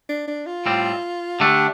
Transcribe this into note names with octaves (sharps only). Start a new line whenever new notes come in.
D4
D4
F4
A2 G3 C4
D3 A3 D4 G4